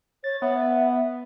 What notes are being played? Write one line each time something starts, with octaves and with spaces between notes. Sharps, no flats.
C#5 A6
B3 E5